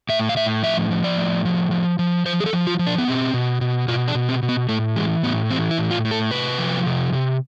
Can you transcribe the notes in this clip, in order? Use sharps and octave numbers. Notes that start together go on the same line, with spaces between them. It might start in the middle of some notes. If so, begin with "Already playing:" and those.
A2 E5
F5
A2 E5
F3 E5
F3
D5
A2
F3
F3
F3
F3 C5
G#4
A4
F3
F4
F3
D4
B3
B2 C4
B2
B2
B2 F4
D4
B2
C4
B2
B3
A2 A3
E3 G#3
A2 B3
E3 C4
E4
A2
F4
A2
A4
C3 B4
F3
C3
C3